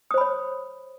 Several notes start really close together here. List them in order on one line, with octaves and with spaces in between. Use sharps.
D#6 C5 B5 C#5